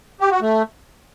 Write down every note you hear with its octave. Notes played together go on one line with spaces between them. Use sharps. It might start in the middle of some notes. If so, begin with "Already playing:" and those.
G4
F#4
A3